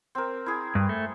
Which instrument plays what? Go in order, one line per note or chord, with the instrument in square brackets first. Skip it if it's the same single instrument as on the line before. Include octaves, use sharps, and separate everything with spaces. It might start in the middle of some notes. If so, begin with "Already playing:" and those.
[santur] C4 A#4
E4 G#4
[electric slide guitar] G2
A3